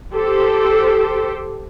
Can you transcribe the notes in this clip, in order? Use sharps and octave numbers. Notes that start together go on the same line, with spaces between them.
G4 A4 C5